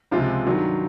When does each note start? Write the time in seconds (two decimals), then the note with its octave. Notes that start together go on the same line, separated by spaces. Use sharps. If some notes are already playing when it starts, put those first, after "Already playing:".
0.11 C#2 C3 F3 G#3 F4
0.46 G2 D#3 F#3